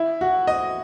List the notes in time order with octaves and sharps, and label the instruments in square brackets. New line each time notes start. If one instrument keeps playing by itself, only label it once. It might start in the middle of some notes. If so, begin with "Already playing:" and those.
Already playing: [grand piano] E4
F#4
D#5